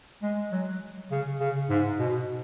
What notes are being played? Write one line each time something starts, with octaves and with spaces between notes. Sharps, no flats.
G#3
F#3
C#3
C#3
G#2
B2